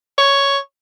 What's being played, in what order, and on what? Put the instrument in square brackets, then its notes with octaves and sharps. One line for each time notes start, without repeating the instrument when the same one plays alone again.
[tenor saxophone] C#5